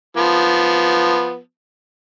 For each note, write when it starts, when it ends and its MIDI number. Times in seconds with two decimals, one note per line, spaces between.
0.17 1.39 53
0.17 1.39 59